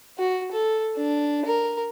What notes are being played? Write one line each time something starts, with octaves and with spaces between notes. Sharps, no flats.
F#4
A4
D4
A#4